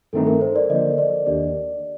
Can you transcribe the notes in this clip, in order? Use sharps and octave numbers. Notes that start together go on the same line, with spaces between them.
G2 D#3 A3 C4 D#4 A4
A#4
C5
D5
D3 F3 A#3 D#5
D5
D#2 D#3 A#3 D4 G4 D5